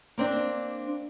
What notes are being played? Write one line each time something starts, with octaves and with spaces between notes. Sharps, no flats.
A#3 C4 D4